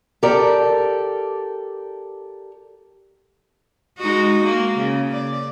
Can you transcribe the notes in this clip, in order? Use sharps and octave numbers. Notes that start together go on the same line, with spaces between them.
G4 A4 A#4 D5
G#3 D#4 F#4
G#3 A#3
C#3
D5